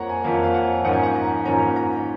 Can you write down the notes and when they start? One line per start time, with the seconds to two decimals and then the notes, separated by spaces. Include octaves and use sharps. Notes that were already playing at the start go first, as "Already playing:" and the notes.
Already playing: F2 F3 A#3 C#5 F#5 A#5
0.09 G#5
0.24 F2 F3 A#3 F5
0.44 F5
0.54 F#5
0.84 G#2 F3 A#3 C#4 F#5
0.93 G#5
1.03 F#5
1.16 A#5
1.45 G#2 F3 A#3 C#4 A#5
1.76 A#5